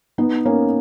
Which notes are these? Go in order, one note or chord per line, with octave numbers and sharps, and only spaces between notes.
B3 D#4
A#3 C#4